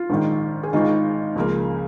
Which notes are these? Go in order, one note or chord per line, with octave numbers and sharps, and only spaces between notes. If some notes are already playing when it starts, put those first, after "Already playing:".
Already playing: F4
A#1 G#2 D#3
G#4
G#1 G#2 D#3 G#3 D#4 F4
C#2 C#3 F3 A#3